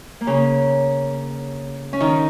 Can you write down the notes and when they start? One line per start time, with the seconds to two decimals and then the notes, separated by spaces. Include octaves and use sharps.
0.21 A#3
0.27 C#3 C#4
1.93 C#4
2.00 D#3 D#4